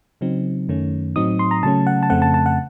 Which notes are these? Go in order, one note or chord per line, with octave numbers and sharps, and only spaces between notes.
C#3 F#3 C4 D#4
F#2 D#3 A3 C#4
A2 F#3 C4 D#4 D#6
C6
A#5
C#3 F#3 A3 C#4 A5
F#5
A5
F2 C#3 A3 C4 F#5
A5
A5
F#5